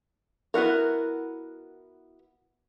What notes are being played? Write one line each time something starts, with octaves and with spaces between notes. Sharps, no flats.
B3 E4 F#4 A#4